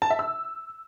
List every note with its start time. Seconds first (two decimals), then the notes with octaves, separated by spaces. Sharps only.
0.02 A5
0.10 E5
0.19 E6